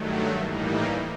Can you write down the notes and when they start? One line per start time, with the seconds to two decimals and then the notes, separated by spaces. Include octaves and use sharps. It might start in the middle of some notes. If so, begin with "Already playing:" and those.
Already playing: G2 D#3 F#3 A3
0.40 A2 E3 G3 A#3 D#4